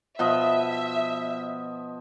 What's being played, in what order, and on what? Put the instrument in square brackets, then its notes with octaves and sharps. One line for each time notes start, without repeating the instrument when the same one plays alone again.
[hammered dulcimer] B2 F3 D#5 [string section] E5